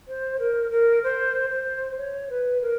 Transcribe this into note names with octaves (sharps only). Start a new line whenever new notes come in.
C5
A#4
A#4
C5
C5
C#5
B4
A#4